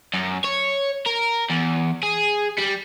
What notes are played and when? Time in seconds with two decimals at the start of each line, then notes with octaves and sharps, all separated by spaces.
0.14 F#2
0.44 C#5
1.06 A#4
1.50 E2
2.03 G#4
2.59 G3